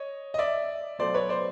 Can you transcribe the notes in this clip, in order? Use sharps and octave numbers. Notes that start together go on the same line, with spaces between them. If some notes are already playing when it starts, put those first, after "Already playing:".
Already playing: C#5 D#5
D#5
D5 E5
B2 F#3 A3 C5 D5
B4 C#5
C5 D5